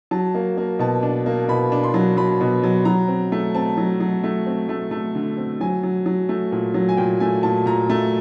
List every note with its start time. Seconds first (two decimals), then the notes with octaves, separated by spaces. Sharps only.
0.11 F#3 A5
0.35 A#3
0.57 A#3
0.79 B2 A5
1.03 D4
1.26 A#3
1.49 B2 B5
1.72 D4
1.83 C6
1.94 F#3
2.17 F#3 B5
2.41 B2
2.63 F#3
2.85 F#3 A#5
3.08 C4
3.32 A3
3.55 C4 A5
3.77 F#3
4.00 F#3
4.24 A3
4.46 C4
4.69 A3
4.91 A3
5.15 D3
5.37 C4
5.61 F#3 G#5
5.83 F#3
6.06 F#3
6.29 A3
6.52 A#2
6.74 F#3
6.89 G#5
6.97 A#2 G5
7.20 A3 G#5
7.43 A#2 A5
7.66 A#2 A#5
7.89 A3